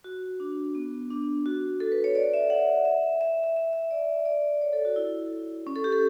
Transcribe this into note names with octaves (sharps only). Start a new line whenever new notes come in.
F#4
D4
B3
D4
F#4
A4
B4
C#5
D5
E5
F#5
E5
E5
E5
E5
E5
D5
D5
C#5
A4
F#4
E4
C#4
A4
G4
A4